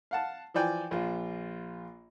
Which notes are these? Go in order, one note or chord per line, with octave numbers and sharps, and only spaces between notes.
F5 F#5 A5
E3 F3 D5 G5 G#5
A#1 F4